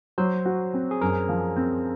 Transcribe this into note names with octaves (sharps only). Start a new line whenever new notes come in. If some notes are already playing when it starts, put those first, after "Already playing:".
F#3 C5
F#4
C4
G#4
F#2 A#4
F3
C4